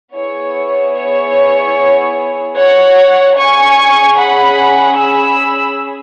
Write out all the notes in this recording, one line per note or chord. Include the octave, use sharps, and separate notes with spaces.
B3 E4 G#4 C#5
C#5
C#5 F#5
C#4 G#4 G#5 C#6
F#5 B5
B5 E6